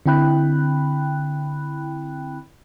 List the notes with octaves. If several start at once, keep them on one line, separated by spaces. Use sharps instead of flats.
D3 C4 E4 G5 B5 F#6